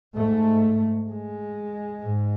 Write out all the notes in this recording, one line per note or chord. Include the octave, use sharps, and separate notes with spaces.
G#2 A3
G#3
G#2